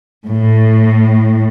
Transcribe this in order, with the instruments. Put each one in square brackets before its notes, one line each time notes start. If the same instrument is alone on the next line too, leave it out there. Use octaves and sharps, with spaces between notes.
[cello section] A2